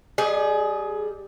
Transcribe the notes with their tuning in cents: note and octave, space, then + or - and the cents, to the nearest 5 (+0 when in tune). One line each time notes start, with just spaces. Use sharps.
G3 +0 G#4 +25 D#5 -20